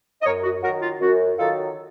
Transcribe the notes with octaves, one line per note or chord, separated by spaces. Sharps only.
D#5
F#2 A#4 C#5
F#4
D#3 F#3 F#4 A#4
F4
F#2 F#4
D#3 F#3 F4 A4